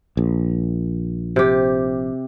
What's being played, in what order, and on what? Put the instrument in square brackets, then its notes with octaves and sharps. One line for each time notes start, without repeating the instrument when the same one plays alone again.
[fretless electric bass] A#1
[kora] C3 G4